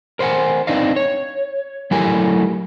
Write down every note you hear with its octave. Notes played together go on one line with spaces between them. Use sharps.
A#4 C5 D#5 F#5 G#5
C4 D4 D#4 B4 D#5 F5
C#5
F#3 A3 E4 G4 A#4 G#5